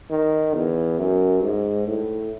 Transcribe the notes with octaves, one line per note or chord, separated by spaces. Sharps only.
D#3
E2
F#2
G#2
A2